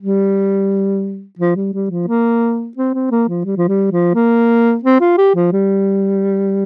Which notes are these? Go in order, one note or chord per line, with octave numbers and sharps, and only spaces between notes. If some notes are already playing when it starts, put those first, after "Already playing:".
G3
F3
G3
G3
F3
A#3
C4
C4
A#3
F3
G3
F3
G3
F3
A#3
C4
F4
G4
F3
G3